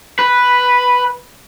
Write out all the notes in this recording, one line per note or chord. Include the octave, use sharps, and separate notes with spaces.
B4